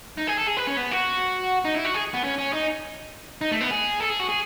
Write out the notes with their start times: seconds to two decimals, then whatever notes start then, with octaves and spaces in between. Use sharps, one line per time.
0.18 D#4
0.28 G#4
0.38 A4
0.47 G#4
0.57 B4
0.67 C#4
0.77 B3
0.91 F#4
1.65 D#4
1.75 E4
1.85 F#4
1.94 G#4
2.14 B3
2.24 C#4
2.38 C#4
2.53 D#4
3.41 D#4
3.51 A3
3.61 B3
3.71 G#4
4.00 A4
4.10 G#4
4.20 F#4
4.29 G#4